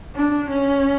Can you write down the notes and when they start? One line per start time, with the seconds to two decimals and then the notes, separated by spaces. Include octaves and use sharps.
0.16 D4
0.50 C#4